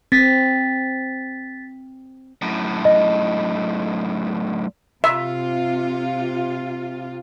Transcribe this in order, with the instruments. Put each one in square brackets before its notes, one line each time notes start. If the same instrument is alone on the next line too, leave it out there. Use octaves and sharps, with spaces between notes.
[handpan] C4 [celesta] A6 B6
[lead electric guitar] F#2 A2
[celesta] D#5
[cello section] C3 F4 [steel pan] E5